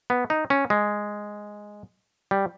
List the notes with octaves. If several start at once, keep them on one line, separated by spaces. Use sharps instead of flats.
B3
D#4
C#4
G#3
G3